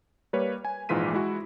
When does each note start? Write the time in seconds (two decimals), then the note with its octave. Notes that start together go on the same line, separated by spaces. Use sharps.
0.33 G3 A#3 B4 C#5
0.65 G#5
0.89 A#1 G#2 E3 F4 B6 D#7
1.13 G#3 E4 F#4